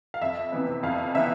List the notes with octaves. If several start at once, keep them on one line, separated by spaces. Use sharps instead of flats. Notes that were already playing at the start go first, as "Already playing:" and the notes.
F5
F2 E5
C3 E3 B3
F2 F5
C3 E3 B3 E5